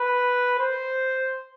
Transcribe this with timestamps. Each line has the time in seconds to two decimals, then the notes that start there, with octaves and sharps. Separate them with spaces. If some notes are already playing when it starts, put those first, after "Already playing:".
Already playing: B4
0.59 C5